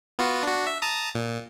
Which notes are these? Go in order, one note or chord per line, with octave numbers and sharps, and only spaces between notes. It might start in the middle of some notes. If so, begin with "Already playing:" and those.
B3 F4 F#4
D4 F#4
E5
A5 A#5 D#6
A#2